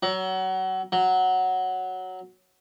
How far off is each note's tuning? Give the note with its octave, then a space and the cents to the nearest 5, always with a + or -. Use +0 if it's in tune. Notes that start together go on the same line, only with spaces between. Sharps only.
F#3 +25
F#3 +0